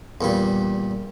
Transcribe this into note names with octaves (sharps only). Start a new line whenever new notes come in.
E2 A#2 G3